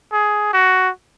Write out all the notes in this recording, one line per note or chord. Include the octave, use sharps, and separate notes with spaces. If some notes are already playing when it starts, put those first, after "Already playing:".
G#4
F#4